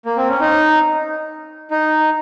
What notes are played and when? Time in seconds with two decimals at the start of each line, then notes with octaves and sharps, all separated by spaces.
0.05 A#3
0.17 C4
0.29 C#4
0.40 D#4
1.71 D#4